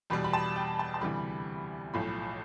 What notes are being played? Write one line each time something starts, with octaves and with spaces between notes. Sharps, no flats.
E2 B2 G3 B5
B5
A5
G5
A5
A5
D2 C3 E3 G3 B5
B1 A2 F3 B5